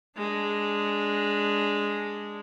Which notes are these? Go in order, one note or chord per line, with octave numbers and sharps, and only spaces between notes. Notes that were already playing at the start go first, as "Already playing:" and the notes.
G#3 D4